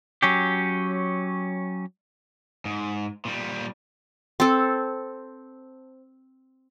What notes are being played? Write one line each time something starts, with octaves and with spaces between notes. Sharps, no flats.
F#3 C#4 G4
G#2
A#2 G3
C4 A4